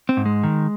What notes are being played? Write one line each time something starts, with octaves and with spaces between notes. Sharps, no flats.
C4
G#2
G#3
D#3